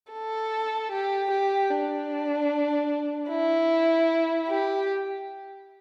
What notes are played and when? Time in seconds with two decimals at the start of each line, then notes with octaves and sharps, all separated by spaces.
0.13 A4
0.92 G4
1.31 G4
1.70 D4
3.29 E4
4.48 G4